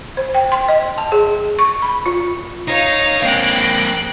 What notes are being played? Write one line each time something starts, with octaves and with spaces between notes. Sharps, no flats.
C5
G5
C6
D#5
A5
G#4
C#6
B5
F4
D#4 C#5 F5
A#3 C4 G5 F#6